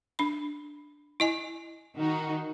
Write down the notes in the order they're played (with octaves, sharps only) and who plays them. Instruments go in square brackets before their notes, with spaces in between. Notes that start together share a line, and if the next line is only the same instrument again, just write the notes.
[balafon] D4 B5
E4 D#5 G#5
[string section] D#3 D#4 F#4